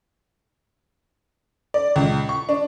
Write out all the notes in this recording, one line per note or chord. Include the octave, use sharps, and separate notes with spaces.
D5
C#2
C#6
D4